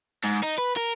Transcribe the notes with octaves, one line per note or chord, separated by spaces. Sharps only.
G#2
D#4
B4
A#4